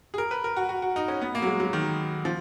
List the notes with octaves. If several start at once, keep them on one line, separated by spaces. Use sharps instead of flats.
G#4
A#4
B4
A#4
F#4
F#4
F#4
D#4
C#4
B3
A#3
F#3
G#3
F#3
D#3
F3